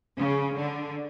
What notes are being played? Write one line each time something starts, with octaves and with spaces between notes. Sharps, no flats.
C#3
D3